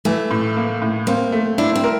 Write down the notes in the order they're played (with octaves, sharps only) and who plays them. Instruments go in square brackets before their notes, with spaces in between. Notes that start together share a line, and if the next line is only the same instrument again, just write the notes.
[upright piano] E3 [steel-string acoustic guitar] A3
[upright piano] A2
A#3
A2
[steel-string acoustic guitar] A#3 [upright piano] C4
[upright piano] A3
[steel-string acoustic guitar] D4 [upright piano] E4
[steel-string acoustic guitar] C4
[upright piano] A#4